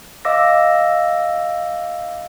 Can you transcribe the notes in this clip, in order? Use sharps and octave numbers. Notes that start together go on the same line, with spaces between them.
D#5 F5 D6 E6 A#6